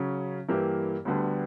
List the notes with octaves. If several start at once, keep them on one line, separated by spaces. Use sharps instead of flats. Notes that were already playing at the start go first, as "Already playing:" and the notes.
Already playing: C#3 F#3 C#4
G2 E3 A#3 E4 G4
D2 D3 G3 B3